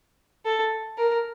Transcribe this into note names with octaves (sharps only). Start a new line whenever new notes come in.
A4
A#4